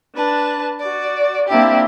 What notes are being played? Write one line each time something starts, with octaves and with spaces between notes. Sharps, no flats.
D4 B4 A5
F#4 D5
A#3 C4 D4 E4 G4